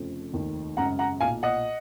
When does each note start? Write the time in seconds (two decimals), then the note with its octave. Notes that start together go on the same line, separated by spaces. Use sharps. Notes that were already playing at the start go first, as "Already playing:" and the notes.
Already playing: F1 F2 C#3
0.33 F1 D#2 D#3
0.77 G#1 F#2 C#3 F#5 A#5
0.99 F#5 A#5
1.21 B1 A#2 F5 G#5
1.43 D#5 F#5